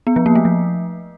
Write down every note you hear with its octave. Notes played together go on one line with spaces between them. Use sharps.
B3
F3
A#3
A3
F3